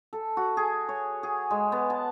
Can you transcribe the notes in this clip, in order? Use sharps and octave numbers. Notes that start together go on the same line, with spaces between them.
A4
F#4
G#4
C#5
G#4
G#3
B3
A5